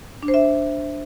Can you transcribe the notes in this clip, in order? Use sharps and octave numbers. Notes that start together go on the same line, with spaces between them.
D4
C5
E5